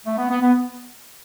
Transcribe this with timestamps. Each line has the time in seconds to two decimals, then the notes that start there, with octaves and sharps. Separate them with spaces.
0.06 A3
0.18 B3
0.30 B3
0.42 B3